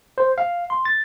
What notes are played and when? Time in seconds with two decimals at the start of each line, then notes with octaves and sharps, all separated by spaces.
0.18 C5
0.38 F5
0.70 C6
0.85 A6